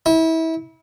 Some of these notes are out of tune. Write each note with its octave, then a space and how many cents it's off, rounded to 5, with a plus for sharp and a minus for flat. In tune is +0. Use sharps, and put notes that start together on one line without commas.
E4 -30